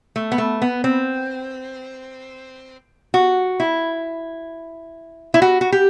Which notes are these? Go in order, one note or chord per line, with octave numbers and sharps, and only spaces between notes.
A3
B3
A3
B3
C4
F#4
E4
E4
F#4
F#4
G4